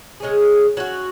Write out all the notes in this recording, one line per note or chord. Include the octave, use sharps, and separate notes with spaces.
C#3 G#3 C#4 G#4
F#3 C#4 F#4